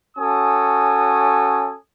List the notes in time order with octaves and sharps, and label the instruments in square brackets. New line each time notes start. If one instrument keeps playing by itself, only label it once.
[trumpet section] C#4 F#4 A4 G#5 D#6